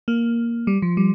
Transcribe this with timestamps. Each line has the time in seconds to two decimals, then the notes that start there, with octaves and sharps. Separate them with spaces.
0.08 A#3
0.67 G3
0.82 F3
0.97 G3